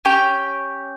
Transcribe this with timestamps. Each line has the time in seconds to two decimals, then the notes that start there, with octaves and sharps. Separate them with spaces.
0.05 C#4 G4 G5